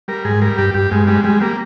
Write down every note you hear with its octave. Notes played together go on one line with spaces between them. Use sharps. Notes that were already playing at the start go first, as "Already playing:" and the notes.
G3 A#4
G#2 G#4
G3 A#4
G2 G4
G2 G4
G2 G#3
G3 G#3
G3 G#3
G3 A#3